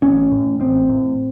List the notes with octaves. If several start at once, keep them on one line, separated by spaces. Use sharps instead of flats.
A1 C#4
A2
A1 C4
A2